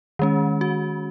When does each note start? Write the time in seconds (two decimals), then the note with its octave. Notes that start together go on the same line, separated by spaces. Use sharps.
0.19 D#3 G#3 C#4
0.61 F#4